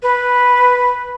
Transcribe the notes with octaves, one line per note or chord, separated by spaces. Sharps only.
B4